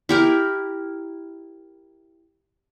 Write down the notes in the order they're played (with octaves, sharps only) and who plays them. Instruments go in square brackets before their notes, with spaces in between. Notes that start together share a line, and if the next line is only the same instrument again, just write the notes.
[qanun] E4 G4 A#4